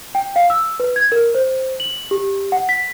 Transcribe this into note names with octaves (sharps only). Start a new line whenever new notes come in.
G5
F5
E6
B4
G#6
A#4
C5
F#7
G4
F#5
B6